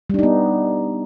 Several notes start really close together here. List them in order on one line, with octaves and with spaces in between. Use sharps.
G3 D4 D#4 B3